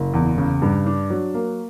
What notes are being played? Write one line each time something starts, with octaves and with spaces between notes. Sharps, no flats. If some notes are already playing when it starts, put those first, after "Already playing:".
Already playing: F#1
E2
C#3
G2
D4
F#3
A#3